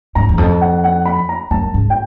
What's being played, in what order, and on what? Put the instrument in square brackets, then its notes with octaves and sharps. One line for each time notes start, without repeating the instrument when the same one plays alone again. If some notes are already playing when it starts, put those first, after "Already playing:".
[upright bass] G#2 [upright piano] A#5
[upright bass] E2
[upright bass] F2 [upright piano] A5
[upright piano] F#5
F#5
B5
A#5
[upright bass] F#2 [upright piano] A5
[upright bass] G#2
[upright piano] G5